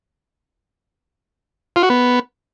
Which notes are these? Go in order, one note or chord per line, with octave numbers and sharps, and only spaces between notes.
F4
F#4
B3